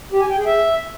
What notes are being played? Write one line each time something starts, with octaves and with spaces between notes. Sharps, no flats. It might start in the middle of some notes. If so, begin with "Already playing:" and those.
G4
G#5
G5
G#4
E5